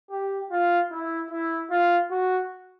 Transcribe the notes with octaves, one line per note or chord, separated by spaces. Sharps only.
G4
F4
E4
E4
F4
F#4